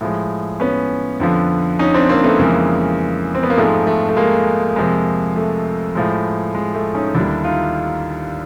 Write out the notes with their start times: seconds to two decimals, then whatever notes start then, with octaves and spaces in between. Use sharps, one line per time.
0.01 A2 F3 G#3
0.60 B3 C#4
1.20 F2 D3 F3
1.79 C#4 D#4
1.94 C4 D4
2.09 A#3 C4
2.24 A3 B3
2.39 F2 C#3 E3 G#3 A#3
3.35 C4
3.43 B3
3.50 A#3
3.57 G#2 F3 G#3 A3
3.87 A3
4.09 A3
4.17 G#3 A#3
4.76 F2 C3 F3 G#3
5.36 A3
5.95 A2 F3 G#3
6.55 G#3
6.75 A3
6.95 C#4 D#4
7.15 D#2 D3 G3 D4 E4
7.44 D#4 F4